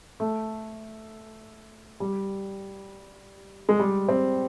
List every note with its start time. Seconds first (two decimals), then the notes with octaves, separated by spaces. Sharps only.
0.20 A3
2.00 G3
3.69 G#3
3.79 G3
4.08 C4